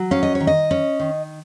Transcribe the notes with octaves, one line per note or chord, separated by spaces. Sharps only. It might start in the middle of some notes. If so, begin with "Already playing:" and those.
Already playing: F#3
C#4 F5
D#5
C#5
D#3
D#5
C#4
D#3